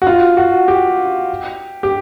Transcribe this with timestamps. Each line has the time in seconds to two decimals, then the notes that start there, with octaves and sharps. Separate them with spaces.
0.02 F#4
0.07 F4
0.37 F#4
0.68 G4
1.83 G4